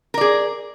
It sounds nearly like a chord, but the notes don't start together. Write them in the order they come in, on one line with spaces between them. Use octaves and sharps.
A#4 D5 G#4